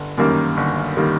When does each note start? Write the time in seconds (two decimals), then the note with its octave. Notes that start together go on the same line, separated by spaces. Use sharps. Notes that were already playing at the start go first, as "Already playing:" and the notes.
Already playing: G1
0.18 F#2 D#3 G3 A#3
0.57 G1
0.97 D#3 G3 A#3